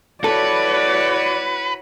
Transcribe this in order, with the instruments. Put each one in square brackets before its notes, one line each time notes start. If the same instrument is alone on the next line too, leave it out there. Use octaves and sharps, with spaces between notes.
[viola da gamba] E4 F#4 C#5 [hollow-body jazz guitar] A4 [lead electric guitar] B4 [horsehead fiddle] D5